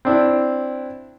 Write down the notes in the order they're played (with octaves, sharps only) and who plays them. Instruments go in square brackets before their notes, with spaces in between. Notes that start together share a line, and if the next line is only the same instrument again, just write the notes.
[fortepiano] C4 D4 E4